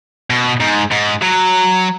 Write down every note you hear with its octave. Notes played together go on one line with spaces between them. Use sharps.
B2
G#2
G#2
F#3